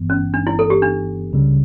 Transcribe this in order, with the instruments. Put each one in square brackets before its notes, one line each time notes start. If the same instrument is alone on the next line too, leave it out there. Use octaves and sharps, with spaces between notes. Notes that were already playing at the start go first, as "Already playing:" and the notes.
Already playing: [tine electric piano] G1 G2 E3 B3
[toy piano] C#4
D4
E4
A4
G4
D4
[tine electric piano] C#2 C#3 G3